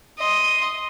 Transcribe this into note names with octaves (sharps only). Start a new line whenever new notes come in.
D#5 C6